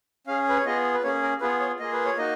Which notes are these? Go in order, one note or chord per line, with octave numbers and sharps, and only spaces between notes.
C#4 G#4 F5
B4
C#5
B3 F4 G#4 D#5
B4
A#3 C#4 G#4 C#5
A#4
B3 F4 G#4 B4
C#5
A#3 F4 G#4 D#5
B4
C#5
A#3 D#4 F#4 D#5